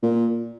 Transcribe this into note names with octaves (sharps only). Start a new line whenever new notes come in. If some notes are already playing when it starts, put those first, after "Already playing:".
A#2